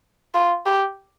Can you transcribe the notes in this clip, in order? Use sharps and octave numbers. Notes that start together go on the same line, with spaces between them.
F4
G4